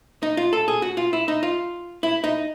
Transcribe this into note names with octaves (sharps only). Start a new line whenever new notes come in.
D#4
F4
A4
G#4
F#4
F4
E4
D#4
F4
E4
D#4